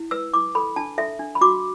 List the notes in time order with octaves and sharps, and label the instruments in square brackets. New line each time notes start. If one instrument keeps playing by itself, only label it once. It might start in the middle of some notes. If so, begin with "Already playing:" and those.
Already playing: [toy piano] E4
B4 E6
E4 D6
A4 B5
D4 A5
A4 E5
D4
B5
F#4 D6